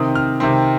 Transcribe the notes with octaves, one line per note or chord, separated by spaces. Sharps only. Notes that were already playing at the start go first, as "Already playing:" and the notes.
Already playing: C3 D#3 C4 D#6
F6
C3 D#3 C4